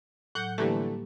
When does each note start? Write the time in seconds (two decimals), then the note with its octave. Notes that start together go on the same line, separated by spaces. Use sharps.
0.35 A2 F#3 F#5 G6
0.58 D3 E3 G3 A3 A#3 G4